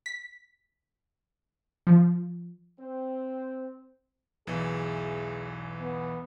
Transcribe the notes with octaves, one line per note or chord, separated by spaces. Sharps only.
B6
F3
C4
B1 E2 E3 G#4
B3